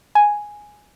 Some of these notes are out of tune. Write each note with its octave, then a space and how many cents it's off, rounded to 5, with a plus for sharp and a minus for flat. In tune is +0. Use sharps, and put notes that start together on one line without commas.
G#5 +0